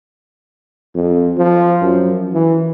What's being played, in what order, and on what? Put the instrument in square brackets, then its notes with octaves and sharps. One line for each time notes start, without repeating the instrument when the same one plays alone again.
[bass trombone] F2
F3
F#2
E3